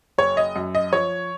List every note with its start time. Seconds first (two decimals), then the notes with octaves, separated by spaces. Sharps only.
0.18 F#1 C#5
0.37 D#5
0.56 F#2
0.75 D#5
0.93 F3 C#5